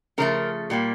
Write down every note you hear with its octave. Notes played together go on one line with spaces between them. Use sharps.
C#3 F3 A3 A#4
A#2 G3 A#3